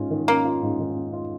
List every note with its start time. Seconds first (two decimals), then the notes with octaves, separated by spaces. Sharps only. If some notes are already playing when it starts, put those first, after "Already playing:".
Already playing: G#2 C#4 F4
0.10 D#3
0.27 A#3 C#4
0.45 F4
0.62 G#2
0.79 D#3
0.96 C#4
1.13 F4